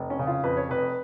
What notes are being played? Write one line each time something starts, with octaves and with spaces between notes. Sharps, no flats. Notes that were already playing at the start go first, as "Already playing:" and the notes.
Already playing: F1
C#4
C#3
F4
F2 B4
C#5
F1 B4